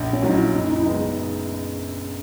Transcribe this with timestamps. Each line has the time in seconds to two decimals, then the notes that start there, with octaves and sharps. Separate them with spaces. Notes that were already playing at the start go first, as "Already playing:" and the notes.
Already playing: A#1
0.13 C#4
0.22 A#2 F#3 D#4
0.33 E4
0.53 F#1 D#4
0.68 D#4
0.76 E4
0.83 F#2 C#3 G#3 B3 D#4
0.99 D#4